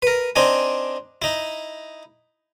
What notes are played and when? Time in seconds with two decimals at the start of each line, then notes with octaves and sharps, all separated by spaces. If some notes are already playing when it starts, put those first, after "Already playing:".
0.02 A#4 B4
0.36 C4 D4 D#4 G#5
1.22 D#4 E4